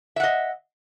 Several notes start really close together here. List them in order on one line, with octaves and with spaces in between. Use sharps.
E5 F#5 D#5